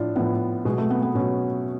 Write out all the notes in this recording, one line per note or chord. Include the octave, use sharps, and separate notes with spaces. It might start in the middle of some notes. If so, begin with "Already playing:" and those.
Already playing: A2 F3 D4 F4
A2 F3 B3
B2 F#3 G#3
A3
B3
B3
B2 F#3 C#4